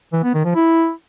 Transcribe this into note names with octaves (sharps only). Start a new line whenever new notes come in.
E3
B3
D#3
F3
E4